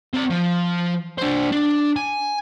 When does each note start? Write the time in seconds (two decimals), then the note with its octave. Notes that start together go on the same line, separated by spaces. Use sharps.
0.14 C4 D5
0.30 F3
1.18 D4 C5
1.52 D4
1.96 G#5